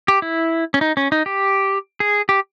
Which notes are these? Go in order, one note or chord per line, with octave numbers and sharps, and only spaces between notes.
G4
E4
C#4
D#4
C#4
D#4
G4
G#4
G4